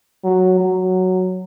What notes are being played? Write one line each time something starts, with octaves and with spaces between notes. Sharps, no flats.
F#3
F#3